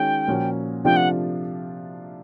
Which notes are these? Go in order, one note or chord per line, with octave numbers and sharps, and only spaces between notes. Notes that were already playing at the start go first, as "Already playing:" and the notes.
Already playing: D#3 G#3 C#4 F#4 G5
A#2 F3 A#3 C#4 F#4
C3 F3 A3 D4 F4 G5
F#5